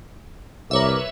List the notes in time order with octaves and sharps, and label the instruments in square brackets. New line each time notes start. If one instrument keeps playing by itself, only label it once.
[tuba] C2 [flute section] A#4 D6 [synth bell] B4 C#5 E5